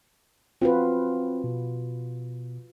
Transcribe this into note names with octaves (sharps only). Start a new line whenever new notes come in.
C4 F4 F#4 B4
B2